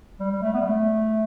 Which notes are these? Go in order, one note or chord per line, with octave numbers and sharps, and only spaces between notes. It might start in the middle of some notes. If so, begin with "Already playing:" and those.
G3
G3
A3
B3
G3
A3